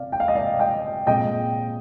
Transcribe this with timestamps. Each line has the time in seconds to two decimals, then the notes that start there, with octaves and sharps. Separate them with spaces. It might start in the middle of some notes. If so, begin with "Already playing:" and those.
Already playing: C3 D5 F5
0.12 G5
0.20 F5
0.28 D#5
0.35 D5 F5
0.59 D#5 G5
1.07 A#2 G#3 C4 D#5 G5